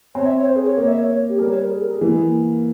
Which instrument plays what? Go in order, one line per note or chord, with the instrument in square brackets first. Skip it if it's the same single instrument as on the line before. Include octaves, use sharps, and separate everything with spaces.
[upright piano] C4 [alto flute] C#5
[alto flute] E5
C#5
C5
G#4
C#5
[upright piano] A#3 [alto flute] C#5
[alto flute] E5
C#5
C#5
G4
[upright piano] G3 [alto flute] A#4
[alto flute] C#5
A#4
G#4
A#4
G#4
[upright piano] E3 [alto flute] A#3
[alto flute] G#3
A#3